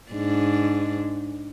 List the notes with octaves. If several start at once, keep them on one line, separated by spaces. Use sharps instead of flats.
G#2 D4